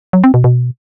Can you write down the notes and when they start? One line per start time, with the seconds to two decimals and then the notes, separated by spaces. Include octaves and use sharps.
0.13 F#3
0.24 C4
0.34 B2
0.44 B2